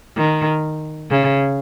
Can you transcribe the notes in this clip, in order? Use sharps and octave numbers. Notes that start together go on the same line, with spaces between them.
D#3
C#3